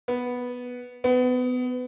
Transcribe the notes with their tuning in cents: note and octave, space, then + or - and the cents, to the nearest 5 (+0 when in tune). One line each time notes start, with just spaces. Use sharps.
B3 -5
B3 +25